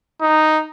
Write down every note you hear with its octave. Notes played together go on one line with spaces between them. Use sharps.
D#4